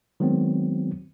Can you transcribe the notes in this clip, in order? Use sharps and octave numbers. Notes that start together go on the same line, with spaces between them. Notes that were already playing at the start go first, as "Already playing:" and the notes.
D#3 F#3 G#3 B3 C4